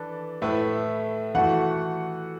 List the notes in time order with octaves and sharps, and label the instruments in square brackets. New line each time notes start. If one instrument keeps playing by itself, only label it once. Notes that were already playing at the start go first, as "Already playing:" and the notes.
Already playing: [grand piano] E3 D4 A4 [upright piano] B4
[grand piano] A2 A3 E4 B4 [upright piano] E5
[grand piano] E3 A3 F#4 A4 [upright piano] F#5